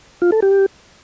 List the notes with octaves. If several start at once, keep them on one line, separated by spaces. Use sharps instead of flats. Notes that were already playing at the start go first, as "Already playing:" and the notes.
F4
A4
G4